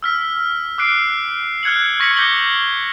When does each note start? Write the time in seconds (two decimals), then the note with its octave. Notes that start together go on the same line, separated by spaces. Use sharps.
0.03 E6 F6 B6
0.78 D6 E6 F#6 C7 D7
1.63 F6 F#6 G#6 C#7 F#7
2.00 C#6 A#6 B6 C#7 F#7
2.16 D6 G6 A#6 B6 F#7 G7